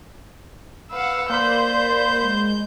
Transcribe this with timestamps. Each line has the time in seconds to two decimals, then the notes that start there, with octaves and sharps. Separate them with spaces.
0.91 B4 F5 F#5 E6
1.30 A#3 C5 D5 B5 G6
2.22 G#3